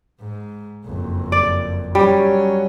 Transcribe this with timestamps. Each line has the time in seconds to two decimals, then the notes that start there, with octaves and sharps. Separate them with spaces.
0.20 G#2
0.85 F#1 F2
1.32 D5
1.95 F#3 G3 C#4